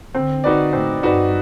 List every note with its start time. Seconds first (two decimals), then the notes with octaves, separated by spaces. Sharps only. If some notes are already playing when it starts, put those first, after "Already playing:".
0.14 D3 C4
0.44 D#4 F#4 B4 D5
0.73 A2 C4
1.03 G2 D#4 F#4 B4 D5